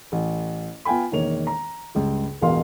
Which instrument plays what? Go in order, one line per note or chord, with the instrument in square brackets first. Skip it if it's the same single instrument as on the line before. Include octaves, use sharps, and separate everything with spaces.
[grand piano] A1
B3 F4 G5 G#5 B5
E1 D#3 A#3 C#5 F7
A#5
C#2 G2 C#3
E1 A1 B2 A#4 F5 C6